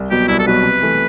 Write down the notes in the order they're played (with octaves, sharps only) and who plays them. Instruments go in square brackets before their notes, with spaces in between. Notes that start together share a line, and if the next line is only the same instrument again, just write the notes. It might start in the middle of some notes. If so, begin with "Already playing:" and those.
Already playing: [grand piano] C2
[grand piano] B2 F#3 B3 [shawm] G4
[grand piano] C2 [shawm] E4
[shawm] A4
[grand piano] B2 F#3 B3 [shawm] B4
[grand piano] C3
E3 A3